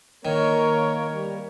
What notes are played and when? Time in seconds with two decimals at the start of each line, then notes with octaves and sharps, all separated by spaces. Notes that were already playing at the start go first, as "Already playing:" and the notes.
0.25 D#3 A#3 A#4 C#5
1.12 G3